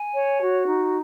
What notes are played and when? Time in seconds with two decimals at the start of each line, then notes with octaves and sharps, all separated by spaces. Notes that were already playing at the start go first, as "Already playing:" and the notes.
Already playing: G#5
0.14 C#5
0.41 F#4
0.66 D#4